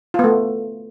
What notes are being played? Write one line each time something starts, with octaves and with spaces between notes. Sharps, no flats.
A3 B3 F4